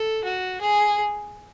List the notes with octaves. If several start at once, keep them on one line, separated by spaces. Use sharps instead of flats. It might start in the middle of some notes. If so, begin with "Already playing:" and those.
Already playing: A4
F#4
G#4